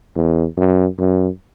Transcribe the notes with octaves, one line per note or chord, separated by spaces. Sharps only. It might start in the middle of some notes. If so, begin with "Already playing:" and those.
E2
F#2
F#2